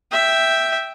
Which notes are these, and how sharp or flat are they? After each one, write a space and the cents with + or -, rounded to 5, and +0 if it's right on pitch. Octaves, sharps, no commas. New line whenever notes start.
E5 +0 G5 +0